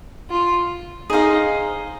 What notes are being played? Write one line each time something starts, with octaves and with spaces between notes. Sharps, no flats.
F4
D#4 G#4 C5 F5